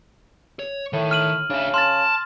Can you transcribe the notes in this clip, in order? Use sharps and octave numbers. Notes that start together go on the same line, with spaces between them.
C#5
A2 D#3
F6 D#7 F#7
C#3 D4 E5
A5 C6 F6 A6